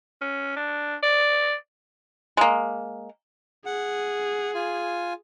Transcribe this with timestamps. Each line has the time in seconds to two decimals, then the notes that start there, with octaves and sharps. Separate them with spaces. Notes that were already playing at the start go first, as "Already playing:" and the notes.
0.21 C#4
0.56 D4
1.03 D5
2.37 G#3 A#3
3.66 G#4 F#5
4.55 F4 G#5